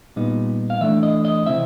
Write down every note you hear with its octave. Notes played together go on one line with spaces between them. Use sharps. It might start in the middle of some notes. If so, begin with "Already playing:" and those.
A#2 G3 B3 D#4
F5
E3 A3 D4 E5
D#5
D#5
C3 E3 G#3 C4 E4 E5